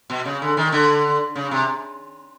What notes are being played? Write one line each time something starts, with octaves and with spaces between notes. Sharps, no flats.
B2
C#3
D3
D#3
D3
C#3
C3